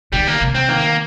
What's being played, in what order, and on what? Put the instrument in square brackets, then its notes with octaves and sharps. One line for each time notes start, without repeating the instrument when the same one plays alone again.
[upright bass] D#3 [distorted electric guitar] G3
[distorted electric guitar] A#3
[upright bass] C3
[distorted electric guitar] C4
[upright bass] D#3 [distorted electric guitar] A#3